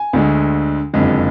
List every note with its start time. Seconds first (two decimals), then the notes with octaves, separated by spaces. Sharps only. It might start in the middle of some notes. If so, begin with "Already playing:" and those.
Already playing: G#5
0.13 D2 D3 G#3
0.94 F#1 F2 D3 G#3